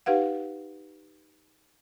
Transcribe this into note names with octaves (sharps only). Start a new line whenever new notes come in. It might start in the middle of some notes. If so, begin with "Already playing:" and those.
D#4 G4 B4 F5 F#5